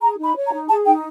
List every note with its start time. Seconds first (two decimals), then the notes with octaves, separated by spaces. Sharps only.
0.01 G#4 A#5
0.18 D#4
0.23 B5
0.35 C#5
0.46 A#5
0.51 D#4
0.68 G#4 A5
0.85 D#4 G5